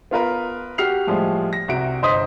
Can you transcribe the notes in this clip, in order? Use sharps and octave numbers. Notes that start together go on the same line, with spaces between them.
B3 F4 A#4 B4
F#4 G4 F6 C7 F7
A2 F3 G3 G#3
A#6
C2 C3 F#4 D7
G1 C5 D#5 C6 D#6 B6